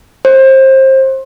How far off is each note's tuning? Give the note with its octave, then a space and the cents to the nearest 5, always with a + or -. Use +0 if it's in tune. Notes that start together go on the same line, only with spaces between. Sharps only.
C5 +25